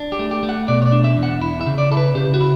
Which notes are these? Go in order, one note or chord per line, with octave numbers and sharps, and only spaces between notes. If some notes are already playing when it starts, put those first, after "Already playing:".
Already playing: D4
G4
A3
G4
A3
F#5
B2 D5
C#5
D5
D4
E5
E2
F#5
E4
E5
C#3
D5
E4 A4
B4
C#3 G4
F#4
E4